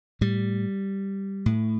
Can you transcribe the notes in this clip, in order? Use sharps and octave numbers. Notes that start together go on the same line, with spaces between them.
A2 G3
A2